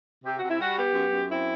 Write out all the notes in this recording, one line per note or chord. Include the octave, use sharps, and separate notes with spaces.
C3 G4
C3 F#4
E4
G3 F#4
B3 G4
F#2
F#2
C4 E4